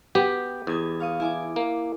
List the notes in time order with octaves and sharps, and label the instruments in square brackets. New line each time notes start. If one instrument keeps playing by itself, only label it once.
[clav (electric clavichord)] B3 [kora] G4
[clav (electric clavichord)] E2 [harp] D#5 D#6 G#6
[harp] F5 C#6 D#6
E4 G#5 D6
[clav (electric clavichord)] A#3